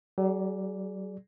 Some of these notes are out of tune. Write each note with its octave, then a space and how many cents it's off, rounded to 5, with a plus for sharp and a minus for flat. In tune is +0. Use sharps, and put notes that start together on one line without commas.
F#3 +45 G#4 +20 D5 +0